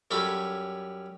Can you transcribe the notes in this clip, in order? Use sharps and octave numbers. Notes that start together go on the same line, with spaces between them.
F#2 G3 C#4 A4 B5